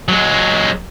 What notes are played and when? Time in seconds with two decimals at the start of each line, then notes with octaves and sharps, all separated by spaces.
0.08 F#3 G#3